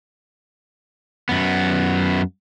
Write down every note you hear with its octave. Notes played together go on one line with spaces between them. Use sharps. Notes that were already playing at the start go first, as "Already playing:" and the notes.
F#2 B3